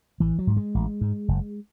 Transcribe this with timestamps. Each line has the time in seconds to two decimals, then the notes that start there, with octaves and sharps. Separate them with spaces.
0.20 A1 E3
0.39 F#3
0.47 G#2
0.57 G#3
0.75 A1
1.01 G#2
1.28 F#1